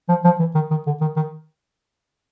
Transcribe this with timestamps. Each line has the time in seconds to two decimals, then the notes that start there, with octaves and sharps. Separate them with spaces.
0.09 F3
0.24 F3
0.40 E3
0.55 D#3
0.71 D#3
0.86 D3
1.01 D#3
1.16 D#3